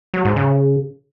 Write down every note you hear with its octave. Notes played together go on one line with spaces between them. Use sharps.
F#3
G#2
C#3